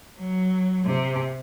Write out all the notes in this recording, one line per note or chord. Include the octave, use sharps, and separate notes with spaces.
F#3
C3